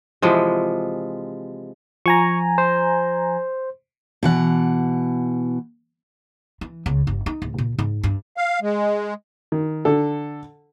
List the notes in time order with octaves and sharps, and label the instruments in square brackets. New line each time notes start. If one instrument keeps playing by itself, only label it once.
[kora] C3 E3 F3 G#3
[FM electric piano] F3 G#5 A#5 [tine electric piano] C#6
[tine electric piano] C5
[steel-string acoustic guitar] B2 E3 F#5
[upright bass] E3
C#2
G1
D#4
D1
A#2
G#2
G2
[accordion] F5
G#3
[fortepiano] D#3
D3 A4